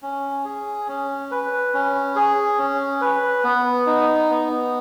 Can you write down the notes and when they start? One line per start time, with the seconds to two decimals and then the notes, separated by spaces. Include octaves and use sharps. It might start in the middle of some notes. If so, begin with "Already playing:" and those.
0.03 C#4
0.45 G#4
0.88 C#4
1.31 B4
1.74 C#4
2.16 G#4
2.58 C#4
3.01 B4
3.44 B3
3.86 D#4
4.30 B3